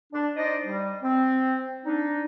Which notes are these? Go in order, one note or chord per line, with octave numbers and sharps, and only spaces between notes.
D4
D#4 C5 D5 D#5
G3
C4
D4 D#4